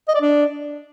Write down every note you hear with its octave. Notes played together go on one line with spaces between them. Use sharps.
D#5
D5
D4